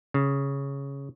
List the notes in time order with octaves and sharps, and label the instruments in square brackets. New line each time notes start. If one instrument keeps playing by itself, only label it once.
[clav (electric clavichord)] C#3